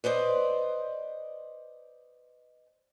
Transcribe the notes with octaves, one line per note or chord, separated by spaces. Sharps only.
B4 C5 D5 D#5